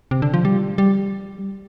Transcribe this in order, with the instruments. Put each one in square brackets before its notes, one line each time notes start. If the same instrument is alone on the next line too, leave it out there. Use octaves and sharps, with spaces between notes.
[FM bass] C3
D3
F3
G3
G3